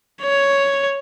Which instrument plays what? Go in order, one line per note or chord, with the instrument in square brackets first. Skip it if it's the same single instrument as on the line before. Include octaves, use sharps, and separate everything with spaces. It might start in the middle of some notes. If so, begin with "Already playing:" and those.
[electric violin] C#5